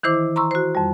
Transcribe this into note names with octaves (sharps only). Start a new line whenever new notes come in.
D#3 E3 E4 C5 D6
A#5 C6 C#6 E6
F#4 C5
F2 G3